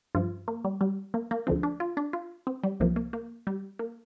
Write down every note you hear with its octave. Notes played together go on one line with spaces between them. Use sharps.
G2 F3 F4
A#3
G3
G3
A#3
A#3
D2 D3 F3 C4
D4
F4
D4
F4
C4
G3
C2 C3 F3 A#3
A#3
A#3
G3
A#3